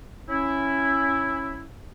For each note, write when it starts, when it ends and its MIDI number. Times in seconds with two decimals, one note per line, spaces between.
0.30 1.65 61
0.30 1.65 64